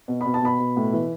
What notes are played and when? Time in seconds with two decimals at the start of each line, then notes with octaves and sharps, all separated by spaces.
0.08 B2
0.21 B2 B5
0.34 A5
0.42 B2 B5
0.60 B2
0.77 A2
0.93 E3